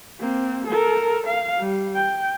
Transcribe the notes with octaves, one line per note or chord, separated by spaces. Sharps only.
A#3 C4
A4 A#4
F5
G3
G5